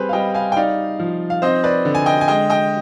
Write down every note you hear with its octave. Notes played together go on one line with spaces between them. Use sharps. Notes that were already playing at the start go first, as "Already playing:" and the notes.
Already playing: G3 C4 G#4 B4 C5
F5
G3 D#5 G5
F5 G#5
G5
D#4 D5 F5
F3
F5
C4 C5 D#5
B4 D5
D3
G#5
D#5 G5
G#5
G#3 D#5 G5
D#5 G5